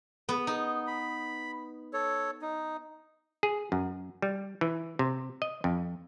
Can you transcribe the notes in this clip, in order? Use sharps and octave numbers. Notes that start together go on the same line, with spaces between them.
B3
D#4
B5
A4 C#5
D#4
G#4
F#2
G3
E3
C3
D#5
F2